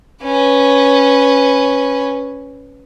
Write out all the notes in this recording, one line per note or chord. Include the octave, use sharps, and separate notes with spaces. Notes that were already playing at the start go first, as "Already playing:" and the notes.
C#4 B4